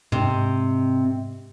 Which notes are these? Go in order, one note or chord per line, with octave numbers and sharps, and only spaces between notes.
G#2 C3